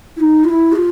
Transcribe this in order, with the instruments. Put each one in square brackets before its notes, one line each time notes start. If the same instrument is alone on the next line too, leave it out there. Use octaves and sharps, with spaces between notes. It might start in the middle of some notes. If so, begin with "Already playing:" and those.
[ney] E4
D#4
F4
E4
G#4
F4